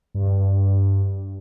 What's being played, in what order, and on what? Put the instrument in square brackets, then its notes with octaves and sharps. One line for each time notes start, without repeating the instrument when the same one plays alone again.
[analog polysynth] G2